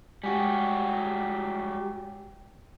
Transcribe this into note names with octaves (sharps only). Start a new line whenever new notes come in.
G3 G#3 F#4 G4 G5